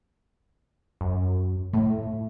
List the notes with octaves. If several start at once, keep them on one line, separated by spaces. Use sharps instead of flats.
F#2
A2 A3